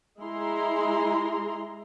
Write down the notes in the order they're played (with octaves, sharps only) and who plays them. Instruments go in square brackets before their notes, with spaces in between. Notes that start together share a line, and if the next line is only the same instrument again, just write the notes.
[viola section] G#3 E4 G#4 A#5 C6